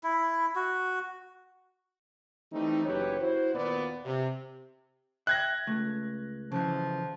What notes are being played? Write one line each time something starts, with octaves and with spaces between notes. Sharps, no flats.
E4
F#4
E3 G3 A3 C4 D#4
F#1 E3 F#3 G4 B4 C#5
E4 F#4 C5
D#2 A#2 B3 D5
C3
E5 G5 F#6 G#6 A#6
C#2 A3
C#3 E3 F3